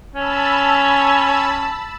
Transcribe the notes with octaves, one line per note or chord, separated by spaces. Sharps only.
C#4 A5 B5 E6